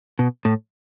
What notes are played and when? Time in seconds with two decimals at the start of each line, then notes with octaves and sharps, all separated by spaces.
0.19 B2
0.45 A2